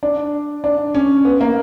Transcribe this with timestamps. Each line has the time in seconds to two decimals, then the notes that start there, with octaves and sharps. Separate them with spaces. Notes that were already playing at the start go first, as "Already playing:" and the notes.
0.03 D4
0.64 D4
0.95 C#4
1.25 B3
1.41 A#3